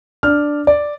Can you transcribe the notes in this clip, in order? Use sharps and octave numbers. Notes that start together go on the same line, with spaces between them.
D4 F6
D5